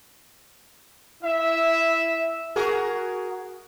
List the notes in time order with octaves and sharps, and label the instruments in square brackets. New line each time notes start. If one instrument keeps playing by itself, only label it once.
[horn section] E4 E5
[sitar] F#4 G#4 A#4